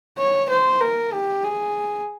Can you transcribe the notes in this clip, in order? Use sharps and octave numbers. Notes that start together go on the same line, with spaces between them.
C#5
C5
A#4
G4
G#4